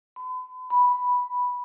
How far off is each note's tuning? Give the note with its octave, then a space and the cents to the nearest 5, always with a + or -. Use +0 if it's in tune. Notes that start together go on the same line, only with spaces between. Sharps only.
B5 +45
B5 +0